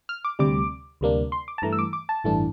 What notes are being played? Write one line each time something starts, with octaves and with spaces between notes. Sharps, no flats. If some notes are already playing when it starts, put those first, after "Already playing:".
F6
D6
D2 C3 G3 D6
D2 C3 G3 A#3 D4
C6
D6
A5
G2 E3 A3 A#5
E6
D6
D6
A5
A1 G2 E3 A3 D4